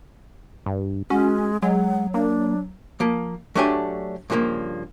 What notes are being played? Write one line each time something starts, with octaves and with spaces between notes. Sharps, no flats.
G2
G#3 C#4 F#4
F#3 G#3 F#5
A#3 D4
F3 A#3
F#3 A3 D4 G4 C#5 G#5
G2 C#3 F3 G#3 A#3